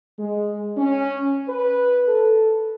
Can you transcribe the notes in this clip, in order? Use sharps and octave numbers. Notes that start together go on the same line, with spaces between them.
G#3
C#4
B4
A4